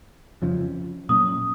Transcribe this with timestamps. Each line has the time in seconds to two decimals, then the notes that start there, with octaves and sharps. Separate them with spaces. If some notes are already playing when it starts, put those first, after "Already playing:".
0.42 F2 C#3 F3
1.09 A#2 F#3 A#3 C#4 D#6